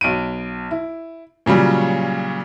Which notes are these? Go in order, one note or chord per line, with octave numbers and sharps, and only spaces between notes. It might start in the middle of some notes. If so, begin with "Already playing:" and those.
B1 D7 D#7
E4
A#2 C#3 F#3 G3